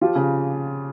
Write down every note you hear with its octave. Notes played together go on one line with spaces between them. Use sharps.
F3 F4 G4
C#3